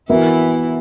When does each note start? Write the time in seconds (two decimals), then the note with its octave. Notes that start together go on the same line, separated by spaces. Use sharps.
0.09 E3 B3 E4 F#4 A#4 E5